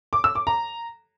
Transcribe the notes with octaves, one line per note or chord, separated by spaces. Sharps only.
D6
E6
D6
A#5